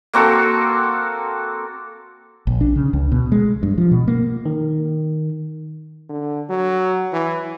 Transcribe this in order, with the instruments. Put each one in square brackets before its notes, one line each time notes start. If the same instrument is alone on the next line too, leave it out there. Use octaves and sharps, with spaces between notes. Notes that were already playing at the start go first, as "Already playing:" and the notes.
[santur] A#3 C4 F#4 A4
[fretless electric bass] A#1
D4
C#3
C#2
B2
G#3
G2
F3
B2
A#3
[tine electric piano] D#3
[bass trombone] D3
F#3
E3